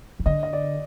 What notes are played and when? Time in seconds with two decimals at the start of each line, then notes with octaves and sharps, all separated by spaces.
0.19 D#3
0.26 D3 D#5
0.43 D#5
0.53 D5